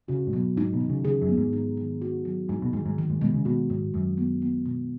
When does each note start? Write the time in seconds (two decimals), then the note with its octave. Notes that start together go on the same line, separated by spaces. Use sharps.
0.08 C#3 F#4
0.27 G#2
0.33 B2 F#3
0.56 G#2 D#4
0.73 B2
0.80 D#3
0.89 C#3
1.05 C#3 G#4
1.21 F#2
1.29 B3
1.37 G#2
1.53 D#4
1.77 D#3
2.02 F#4
2.25 F#3
2.49 G#2 D#4
2.62 B2
2.73 G#2 D#3
2.86 G#2
2.98 D#3
3.10 G#2
3.21 B2 G#3
3.34 C#3
3.45 B2 F#4
3.70 G#2 D#3
3.94 F#2 D#3
4.18 B3
4.42 B3
4.66 B2